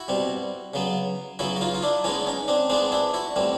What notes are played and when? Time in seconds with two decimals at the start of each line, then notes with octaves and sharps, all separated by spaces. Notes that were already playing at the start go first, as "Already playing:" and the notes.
Already playing: E4 F#4
0.08 B2 G3 C4
0.74 C#3 F#3 B3
1.39 C#3 F#3 B3 E4 F#4
1.56 F#4
1.61 D#4 F4
1.74 F4
1.82 D4 E4
2.04 E3 G#3 B3 C#4 D#4
2.27 C#4 D#4
2.48 C4 D4
2.70 E3 G#3 B3 C4 D4
2.92 D4 E4
3.14 E4 F#4
3.36 A2 E3 G3 C4